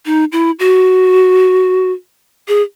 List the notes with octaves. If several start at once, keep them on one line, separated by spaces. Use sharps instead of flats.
D#4
E4
F#4
G#4